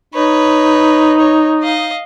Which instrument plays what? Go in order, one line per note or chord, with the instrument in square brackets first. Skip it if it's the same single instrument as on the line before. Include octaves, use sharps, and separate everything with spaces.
[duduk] D#4 [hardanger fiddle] B4 C#5
[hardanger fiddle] C#5
D#5 F5